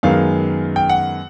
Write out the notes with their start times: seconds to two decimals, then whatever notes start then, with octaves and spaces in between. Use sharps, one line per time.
0.03 F#2 D#3 G#3 B3 F5
0.76 G5
0.89 F#5